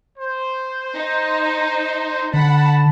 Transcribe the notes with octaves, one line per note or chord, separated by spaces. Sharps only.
C5
D#4
D3 F#5 A5 B5